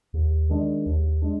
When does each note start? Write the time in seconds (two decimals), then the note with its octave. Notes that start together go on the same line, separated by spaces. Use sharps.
0.14 D#2
0.49 D#3 G#3 D4
0.86 D#2
1.22 G#3 D4